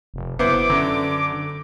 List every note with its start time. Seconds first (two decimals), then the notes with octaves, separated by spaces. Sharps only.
0.14 F1
0.39 F#1 B3 E4 C5 D6
0.70 F#2 D3